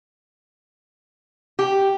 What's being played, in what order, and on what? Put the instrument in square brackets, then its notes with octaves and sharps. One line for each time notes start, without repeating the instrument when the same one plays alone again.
[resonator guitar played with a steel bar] G4